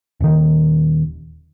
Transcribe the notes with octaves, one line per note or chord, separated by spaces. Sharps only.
D#1 D#3